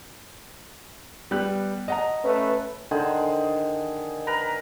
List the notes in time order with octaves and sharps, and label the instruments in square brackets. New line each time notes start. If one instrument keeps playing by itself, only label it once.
[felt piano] G3 B3 F#6
D#5 F#5 A#5
[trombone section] A3 C#4 B4
[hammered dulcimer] D3 D#3 G#4 C5
A#4 B4 A#5